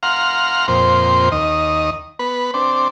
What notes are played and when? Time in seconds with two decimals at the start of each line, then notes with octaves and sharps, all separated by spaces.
0.03 F5 F#5 A#5 C6 F6
0.68 F2 A#2 C4 C5
1.32 D#2 D#5
2.19 B3 B4
2.54 C4 D4